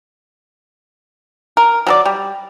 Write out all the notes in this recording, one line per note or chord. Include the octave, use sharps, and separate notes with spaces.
A#4
F#3 A4 D5
G3